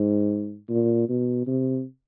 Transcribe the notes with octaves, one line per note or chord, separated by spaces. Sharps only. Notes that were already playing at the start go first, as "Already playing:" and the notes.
Already playing: G#2
A#2
B2
C3